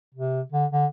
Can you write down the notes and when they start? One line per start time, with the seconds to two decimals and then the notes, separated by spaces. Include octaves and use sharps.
0.14 C3
0.52 D3
0.72 D3